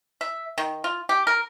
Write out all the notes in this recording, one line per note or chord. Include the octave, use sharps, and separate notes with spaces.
E5
D#3
F4
G4
A#4